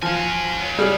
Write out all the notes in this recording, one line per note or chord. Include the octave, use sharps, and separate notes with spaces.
F3 F#4 G#5
C#2
G3 G#4 F6